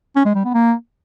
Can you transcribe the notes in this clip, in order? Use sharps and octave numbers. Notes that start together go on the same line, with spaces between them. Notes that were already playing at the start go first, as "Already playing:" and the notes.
C#4
G#3
G3
B3
A#3